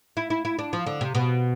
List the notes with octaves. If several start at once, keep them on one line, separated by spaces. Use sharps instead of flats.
E4
E4
E4
D4
F3
D3
C3
B2